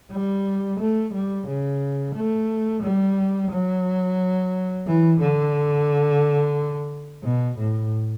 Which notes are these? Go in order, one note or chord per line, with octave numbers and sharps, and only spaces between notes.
G3
A3
G3
C#3
A3
G3
F#3
E3
D3
B2
A2